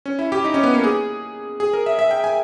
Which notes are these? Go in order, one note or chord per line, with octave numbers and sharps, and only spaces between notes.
C#4
E4
G4
D#4
C#4
B3
A#3
G#4
G#4
A#4
E5
E5
G5
G#5